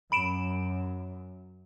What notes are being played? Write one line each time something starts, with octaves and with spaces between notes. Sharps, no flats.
F#2 B5 D7 E7